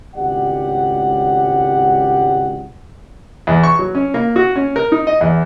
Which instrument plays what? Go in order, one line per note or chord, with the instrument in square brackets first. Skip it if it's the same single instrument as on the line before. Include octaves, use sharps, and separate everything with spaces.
[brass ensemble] G#1 C#2 A2 G4 D5 F#5
[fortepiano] E2
C#6
F#3
C#4
A#3
F#4
C#4
A#4
D#4
D#5
E2